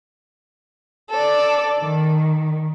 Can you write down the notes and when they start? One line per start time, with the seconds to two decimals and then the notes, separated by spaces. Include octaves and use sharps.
1.11 A4 D5
1.80 D#3